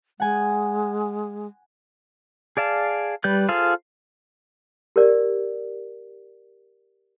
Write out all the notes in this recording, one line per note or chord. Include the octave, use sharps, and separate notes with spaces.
G#3 F#5 G#5
G#4 D5 F5 A5
G3 B4 D5 G6
F4 G#4 A4 C5 F5
G4 A#4 D5